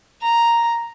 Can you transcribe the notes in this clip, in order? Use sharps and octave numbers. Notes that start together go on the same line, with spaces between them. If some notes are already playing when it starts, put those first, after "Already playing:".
A#5